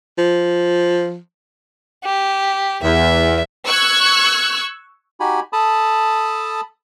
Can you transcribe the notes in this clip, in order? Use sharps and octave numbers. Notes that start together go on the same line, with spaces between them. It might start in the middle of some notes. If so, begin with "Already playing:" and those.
F3
G4
E2 E5
C#6 E6 F#6 G#6
D#4 F#4 G4 G#5 B5
A4 A5 B5 D#6